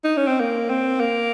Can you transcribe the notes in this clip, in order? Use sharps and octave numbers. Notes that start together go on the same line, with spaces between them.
D#4
C#4
C4
A#3
C4
A#3